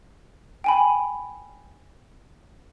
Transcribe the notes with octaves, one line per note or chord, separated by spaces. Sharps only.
G5 G#5 B5